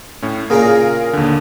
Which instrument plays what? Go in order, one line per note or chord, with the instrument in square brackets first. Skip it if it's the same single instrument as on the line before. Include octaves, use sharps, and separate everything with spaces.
[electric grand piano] A2 C#4
[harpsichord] A#2 C#3 A#5 [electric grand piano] G#4 A#4 D#6
[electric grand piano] D#2 D3